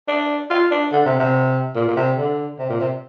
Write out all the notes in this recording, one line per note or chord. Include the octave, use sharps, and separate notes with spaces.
D4
F4
D4
D3
C3
C3
A#2
A#2
C3
D3
C3
A#2
C3